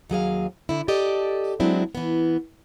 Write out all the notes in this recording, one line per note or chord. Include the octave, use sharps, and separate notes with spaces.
D#2 F#3 G#4 F5
D3 E4
G4 A4 D5 D#5
F#3 G#3 C4 D4 E4
E3 B3